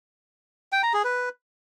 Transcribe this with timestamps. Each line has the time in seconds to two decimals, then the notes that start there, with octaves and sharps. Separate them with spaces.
0.72 G5
0.83 A#5
0.94 G#4
1.04 B4